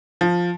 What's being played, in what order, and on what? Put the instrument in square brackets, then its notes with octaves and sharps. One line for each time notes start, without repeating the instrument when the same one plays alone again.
[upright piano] F3